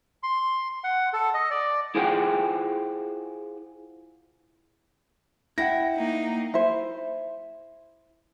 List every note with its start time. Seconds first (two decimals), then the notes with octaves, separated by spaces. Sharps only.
0.23 C6
0.84 F#5
1.13 A4
1.34 D#5
1.51 D5
1.95 E4 F4 G#4 C5 F#5 G5
5.58 E4 F#5 G5 A#6
5.97 A#3 D#4
6.54 E4 C5